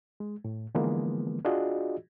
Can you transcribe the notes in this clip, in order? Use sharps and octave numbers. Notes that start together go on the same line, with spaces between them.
G#3
A2
D3 E3 F3 G#3 A#3 B3
D4 F4 F#4 G#4 D5 D#5